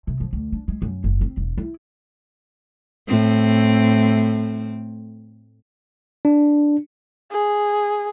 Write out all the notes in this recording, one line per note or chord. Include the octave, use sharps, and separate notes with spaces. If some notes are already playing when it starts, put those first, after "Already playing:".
C3
F3
D2
D4
G#3
F#2
F#1
C4
E1
E4
A2 C4
D4
G#4